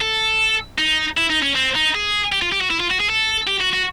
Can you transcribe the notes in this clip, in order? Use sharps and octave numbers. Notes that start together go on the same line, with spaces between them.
A4
D#4
E4
D#4
C#4
C4
D#4
G#4
G4
F4
G4
F#4
E4
F4
F#4
G#4
A4
G4
F#4
F#4